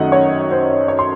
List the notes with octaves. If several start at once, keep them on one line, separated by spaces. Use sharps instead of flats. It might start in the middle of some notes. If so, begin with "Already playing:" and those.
Already playing: F#2 D#3 A3 D#5 F#5
C#5
C5
C#5
C6